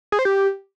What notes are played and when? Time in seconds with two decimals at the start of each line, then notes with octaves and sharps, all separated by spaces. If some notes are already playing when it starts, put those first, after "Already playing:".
0.12 G#4
0.19 C5
0.25 G4